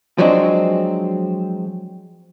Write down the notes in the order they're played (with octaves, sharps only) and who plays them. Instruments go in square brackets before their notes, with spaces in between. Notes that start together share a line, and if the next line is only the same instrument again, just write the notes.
[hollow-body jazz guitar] F3 F#3 G#3 C4 D4